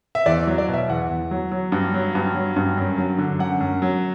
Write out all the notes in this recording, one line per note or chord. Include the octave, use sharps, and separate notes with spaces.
E5
E2 D5
F#3
D5
B2 E5
E2 F#5
E2
F#3
F#3
G2
F#3
G2
F#3
G2
F#2
F#3
D3
F#2 F#5
F#2
F#3